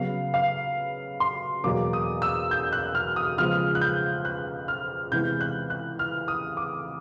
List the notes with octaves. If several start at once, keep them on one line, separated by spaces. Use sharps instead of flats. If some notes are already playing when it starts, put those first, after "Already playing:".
Already playing: C#3 F#3 B3 F5
F5
C6
E2 B2 F#3 A#3 D6
D#6
E6
G6
F#6
F6
D#6
C#3 F3 G#3 B3 F6
F#6
G6
F#6
F6
C3 E3 G#3 B3 G6
F#6
F#6
F6
D#6
D6